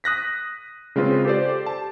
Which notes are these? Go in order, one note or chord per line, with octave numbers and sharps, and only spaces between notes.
D#6 F#6 A#6 B6
C#3 G#3 C4 F4 B4
G4 A4 C5 D5
A5